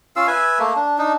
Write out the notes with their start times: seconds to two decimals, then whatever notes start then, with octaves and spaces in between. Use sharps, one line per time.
0.16 C#4 F4 F5 E6
0.28 B4 E5 G#5
0.59 A3 A#3
0.76 D4
0.98 D4 D#4